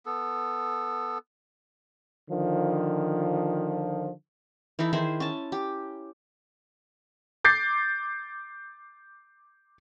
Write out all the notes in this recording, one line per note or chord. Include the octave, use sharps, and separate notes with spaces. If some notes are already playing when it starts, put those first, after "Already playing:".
B3 A4
D3 D#3 F3
E3 D#4 E4 A4
D#3 E4 G#4 C5
C#4 A5
G4
D6 G6 A6 C7